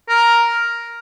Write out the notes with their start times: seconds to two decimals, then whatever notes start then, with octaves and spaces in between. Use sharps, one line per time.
0.09 A#4